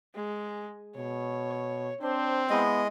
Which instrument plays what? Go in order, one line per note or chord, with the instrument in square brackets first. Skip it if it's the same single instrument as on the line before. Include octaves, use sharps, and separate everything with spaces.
[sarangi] G#3
[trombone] B2 [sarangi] C#5
[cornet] C4 [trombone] D4 [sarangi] C5
[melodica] G#3 D#5 [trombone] B3 [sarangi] E4